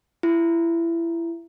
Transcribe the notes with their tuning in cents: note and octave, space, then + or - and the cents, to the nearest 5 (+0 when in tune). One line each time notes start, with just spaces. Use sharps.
E4 +25